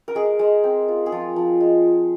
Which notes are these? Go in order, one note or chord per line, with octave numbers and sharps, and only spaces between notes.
A#4
G#3 G#4
G#3
C4
F4
G#4
F3 F4
F3
G#3